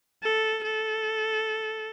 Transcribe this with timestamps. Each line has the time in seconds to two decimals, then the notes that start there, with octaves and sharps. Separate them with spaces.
0.23 A4
0.64 A4